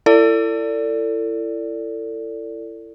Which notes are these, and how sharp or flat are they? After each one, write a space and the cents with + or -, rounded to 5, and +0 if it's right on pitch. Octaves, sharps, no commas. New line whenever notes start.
E4 +25 A4 +35 D5 -15